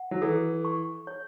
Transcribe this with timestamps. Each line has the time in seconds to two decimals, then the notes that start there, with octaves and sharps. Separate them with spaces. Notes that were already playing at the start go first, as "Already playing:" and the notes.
Already playing: F#5
0.11 F#3
0.22 E3 A4
0.65 C#6
1.07 C#5